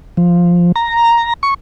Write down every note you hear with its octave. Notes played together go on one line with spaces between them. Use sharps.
F3
A#5
C#6